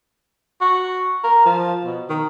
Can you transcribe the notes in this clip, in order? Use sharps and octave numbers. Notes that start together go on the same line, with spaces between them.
F#4
A#4
F3
B2
D#3